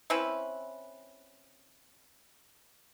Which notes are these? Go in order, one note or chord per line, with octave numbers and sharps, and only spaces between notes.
C4 C#4 E4 B4